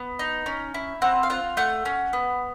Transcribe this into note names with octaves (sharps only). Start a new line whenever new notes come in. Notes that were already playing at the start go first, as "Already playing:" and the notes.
Already playing: B3
D#4
C#4
E4
C4 F#5
F5
F4 F#5
A3 F#5
C#4
B3